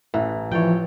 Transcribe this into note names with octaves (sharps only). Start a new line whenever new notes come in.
A1 E3
E3 F3 C#5 D5 G5